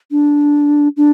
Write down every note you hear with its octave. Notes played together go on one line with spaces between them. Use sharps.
D4
D4